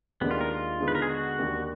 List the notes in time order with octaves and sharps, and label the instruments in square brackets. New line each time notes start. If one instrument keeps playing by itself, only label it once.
[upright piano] D#2 D#3 G#3 D4 [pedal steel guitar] B3
[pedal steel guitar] F4
A#4
F4
[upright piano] D3 G#3 B3 D#4
[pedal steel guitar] B4
A#4
G#4
F#4
[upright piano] D#2 D#3 A#3 D4